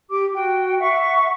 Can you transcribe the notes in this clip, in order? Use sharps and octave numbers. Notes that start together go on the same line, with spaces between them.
G4 D6
F#4 G5
E5 F#5 C#6